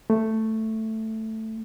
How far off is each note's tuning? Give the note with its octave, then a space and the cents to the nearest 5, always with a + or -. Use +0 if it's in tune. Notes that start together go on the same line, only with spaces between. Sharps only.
A3 +5